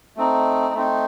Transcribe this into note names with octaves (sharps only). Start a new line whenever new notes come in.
A3 C4 D#4
A3 C4 D#4